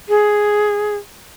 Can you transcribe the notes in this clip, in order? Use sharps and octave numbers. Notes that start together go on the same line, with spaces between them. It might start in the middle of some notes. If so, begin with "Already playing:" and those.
G#4